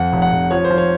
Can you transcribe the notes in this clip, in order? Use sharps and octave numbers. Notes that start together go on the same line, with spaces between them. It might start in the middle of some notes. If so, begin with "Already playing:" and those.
Already playing: F2 F#5
F1
F#5
F1
F3 C#5
C5
F3
C#5